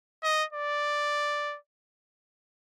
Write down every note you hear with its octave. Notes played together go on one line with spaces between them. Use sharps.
D#5
D5